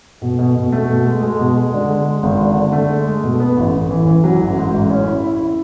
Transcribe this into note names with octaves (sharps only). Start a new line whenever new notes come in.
B2
B2
B2
A3
B2
G#3
G#3
B2
G#3
D3
G#3
G#3
G#1
D3
D3
A3
G#3
G#3
B2
B3
A1
A1
E3
E3
F#3
A1
G#2
A1
C#4
E4
E4
E4